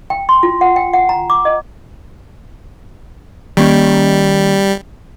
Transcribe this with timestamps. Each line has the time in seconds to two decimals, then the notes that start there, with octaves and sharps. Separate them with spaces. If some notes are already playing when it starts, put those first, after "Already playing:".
0.10 G5
0.29 C6
0.43 F4
0.61 F#5
0.76 G5
0.93 F#5
1.09 A#5
1.30 D6
1.45 D#5
3.57 D#3 G3 A#3 C#4